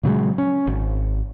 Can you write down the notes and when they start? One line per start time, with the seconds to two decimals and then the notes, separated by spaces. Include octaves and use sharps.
0.03 A#2 C#3 F#3 G#3
0.38 C#4
0.67 G#1